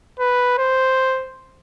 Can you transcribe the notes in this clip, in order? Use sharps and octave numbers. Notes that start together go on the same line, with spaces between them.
B4
C5